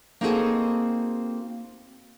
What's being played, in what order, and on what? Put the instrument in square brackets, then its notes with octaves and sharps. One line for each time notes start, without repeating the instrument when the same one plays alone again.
[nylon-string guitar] A#3 C4 D#4 F#4 G#4 A4